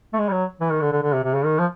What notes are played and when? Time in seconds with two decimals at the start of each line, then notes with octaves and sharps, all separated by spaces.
0.13 A3
0.19 G#3
0.28 G3
0.32 F#3
0.60 E3
0.71 D#3
0.81 D3
0.92 D3
1.03 D3
1.13 C3
1.24 C3
1.34 C#3
1.44 D#3
1.59 F3